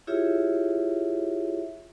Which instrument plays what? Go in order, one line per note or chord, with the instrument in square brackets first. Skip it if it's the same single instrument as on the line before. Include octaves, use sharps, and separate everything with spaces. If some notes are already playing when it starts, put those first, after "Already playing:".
[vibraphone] E4 F4 G4 G#4 C#5 E5